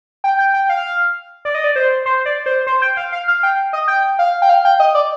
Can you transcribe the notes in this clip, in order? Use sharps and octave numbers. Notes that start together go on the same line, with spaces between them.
G5
G5
G5
F5
D5
D#5
D5
C5
C5
D5
C5
C5
G5
F5
F5
F5
G5
D#5
G5
F5
G5
F5
G5
D#5
D5